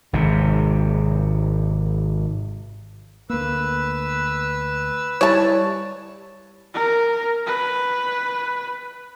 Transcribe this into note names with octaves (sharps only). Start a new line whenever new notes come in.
G#1 G#2 C3
D2 A#3 B4 E6
G3 E4 C#5 A5
A#4
B4